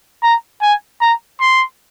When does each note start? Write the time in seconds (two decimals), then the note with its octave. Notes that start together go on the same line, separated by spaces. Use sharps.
0.23 A#5
0.62 G#5
1.01 A#5
1.40 C6